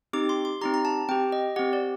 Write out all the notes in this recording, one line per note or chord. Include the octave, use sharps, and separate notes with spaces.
C4 D#4 G4 D6
C6
C6
C4 D#4 G4 A#5
A#5
A5
C4 G4 G5
D#5
C4 G4 F#5
D5